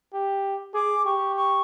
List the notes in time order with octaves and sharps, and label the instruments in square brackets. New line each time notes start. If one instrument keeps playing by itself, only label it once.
[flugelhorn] G4
[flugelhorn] G#4 [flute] D6
[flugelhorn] G4 [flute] C#6
[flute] C#6